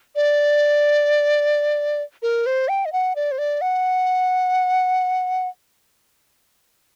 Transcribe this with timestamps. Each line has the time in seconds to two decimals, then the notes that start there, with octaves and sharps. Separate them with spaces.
0.16 D5
2.22 A#4
2.46 C5
2.68 G5
2.85 D#5
2.93 F#5
3.16 D5
3.32 C5
3.38 D5
3.61 F#5